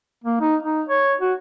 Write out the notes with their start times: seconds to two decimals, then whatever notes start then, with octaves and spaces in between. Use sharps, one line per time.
0.24 A#3
0.41 D#4
0.63 D#4
0.89 C#5
1.20 F#4